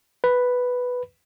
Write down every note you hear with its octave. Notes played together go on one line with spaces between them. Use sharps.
B4